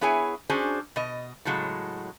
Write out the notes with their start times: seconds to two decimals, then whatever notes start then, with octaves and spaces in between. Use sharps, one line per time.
0.01 B3 E4 G#4 C#5 G#5
0.49 C#4 D4 F#4 G#4 C5
0.96 B2 D#5
1.45 A2 C#3 F#3 G#3